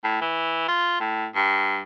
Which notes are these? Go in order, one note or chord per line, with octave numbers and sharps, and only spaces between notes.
A2
E3
F4
A2
G2